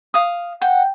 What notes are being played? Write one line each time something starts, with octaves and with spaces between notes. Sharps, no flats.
F5 D#6
F#5 G5